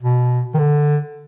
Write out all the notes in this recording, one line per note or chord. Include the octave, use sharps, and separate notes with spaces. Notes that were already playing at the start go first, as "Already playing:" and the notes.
B2
D#3
D3